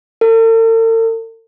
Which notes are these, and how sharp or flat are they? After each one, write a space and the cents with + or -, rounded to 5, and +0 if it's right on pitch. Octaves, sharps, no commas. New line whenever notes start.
A4 +45